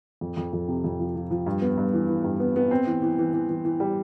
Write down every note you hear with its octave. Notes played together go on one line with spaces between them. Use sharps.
F2
F2
F2
C3
F2
F3
F3
F3
G2
B3
G2
E3
E3
G2
B3
B3
C4
E3
E3
E3
E3
E3
E3
G3